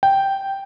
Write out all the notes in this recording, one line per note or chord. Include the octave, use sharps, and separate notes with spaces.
G5